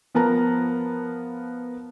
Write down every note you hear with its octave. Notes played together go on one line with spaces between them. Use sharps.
F3 B3 A#4 A5 A#5